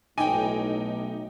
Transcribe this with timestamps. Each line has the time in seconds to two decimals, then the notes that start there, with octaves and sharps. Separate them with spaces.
0.18 B1 A2 D#4 G5 G#5 D6 D#7